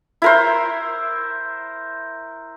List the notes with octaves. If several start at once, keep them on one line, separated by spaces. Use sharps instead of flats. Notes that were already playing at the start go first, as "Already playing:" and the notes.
E4 A#4 C5